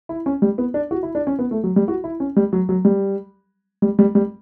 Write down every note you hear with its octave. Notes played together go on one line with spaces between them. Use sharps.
E4
C#4
G3
B3
D4
F#4
E4
D4
C#4
B3
A3
F#3
G3
F#4
E4
C#4
G3
F#3
F#3
G3
G3
G3
G3